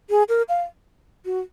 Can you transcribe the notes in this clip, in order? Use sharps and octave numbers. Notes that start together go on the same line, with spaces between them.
G#4
A#4
F5
F#4